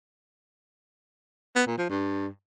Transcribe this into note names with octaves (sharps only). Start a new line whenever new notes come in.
B3
A#2
F3
G2